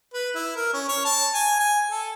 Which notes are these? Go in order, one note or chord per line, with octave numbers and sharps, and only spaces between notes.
B4
E4
A#4
C#4
C#5
A5
G#5
G#5
A4